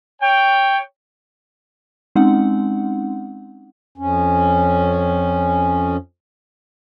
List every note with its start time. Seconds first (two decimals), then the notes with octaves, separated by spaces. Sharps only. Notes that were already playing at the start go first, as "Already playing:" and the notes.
0.22 C#5 G5
2.16 G#3 C4 C#4 D#4 F#5
3.98 F2 C#4